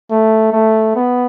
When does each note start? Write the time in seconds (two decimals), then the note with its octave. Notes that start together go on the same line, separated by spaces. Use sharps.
0.11 A3
0.52 A3
0.95 B3